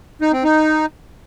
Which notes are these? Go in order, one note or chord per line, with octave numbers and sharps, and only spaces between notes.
D#4
C4
D#4